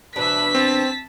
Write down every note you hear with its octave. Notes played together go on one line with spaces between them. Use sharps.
E2 B2 D4 B4 E5 B5 B6
C4 A5